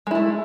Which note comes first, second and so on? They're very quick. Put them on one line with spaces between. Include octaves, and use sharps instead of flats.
G#3 E4 A3